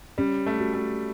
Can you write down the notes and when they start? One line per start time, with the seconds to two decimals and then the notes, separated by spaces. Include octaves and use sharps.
0.18 G3 C#4
0.46 A3
0.60 F#4
0.74 A3